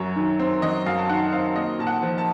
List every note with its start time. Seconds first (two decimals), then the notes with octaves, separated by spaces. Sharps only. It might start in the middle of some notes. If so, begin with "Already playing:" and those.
Already playing: F#2 F#3 C#5
0.16 D#3
0.39 C4
0.62 F#3 D#5
0.86 F#2 F5
0.98 A5
1.09 D#3 F#5
1.32 C4 F5
1.56 A#3 D#5
1.79 A#2 A5
1.87 F#5
2.03 F3
2.18 A5